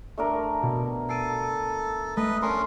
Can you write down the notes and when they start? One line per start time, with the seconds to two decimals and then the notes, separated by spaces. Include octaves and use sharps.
0.18 A3 D4 A#4
0.63 B2
1.09 A4 C7 D7 D#7
2.17 A3 B4 D#5
2.42 C#4 D4 A#4 C6